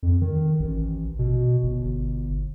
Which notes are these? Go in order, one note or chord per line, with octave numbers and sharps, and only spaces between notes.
F2
D#3
A1
B2
G1